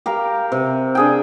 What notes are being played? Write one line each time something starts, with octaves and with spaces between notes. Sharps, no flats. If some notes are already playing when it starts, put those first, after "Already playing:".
G4 A#4 F5
C3
D4 G#4 G5